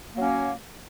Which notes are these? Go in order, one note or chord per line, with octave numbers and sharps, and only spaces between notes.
F#3 A#3 C#4